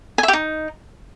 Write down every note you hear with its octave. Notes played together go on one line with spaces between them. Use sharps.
G#5
E5
G4
D#4